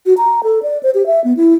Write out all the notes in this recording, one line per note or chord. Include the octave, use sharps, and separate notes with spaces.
F#4
A#5
A4
D5
C5
G4
E5
B3
E4